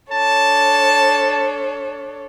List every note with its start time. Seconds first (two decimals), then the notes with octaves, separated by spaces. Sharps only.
0.12 D4 A4 C#5 A5